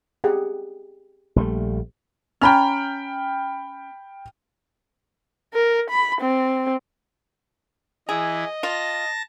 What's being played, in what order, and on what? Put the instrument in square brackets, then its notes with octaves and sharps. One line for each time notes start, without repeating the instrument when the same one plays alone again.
[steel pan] G4 G#4 F#5
[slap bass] A#1 G3 A3
[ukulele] C#4 A#5 [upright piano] G5 B5 F6
[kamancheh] A#4
B5
C4
[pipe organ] E3 E4 [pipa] G#4 [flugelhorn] D#5
[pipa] F4 [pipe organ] A5 A#6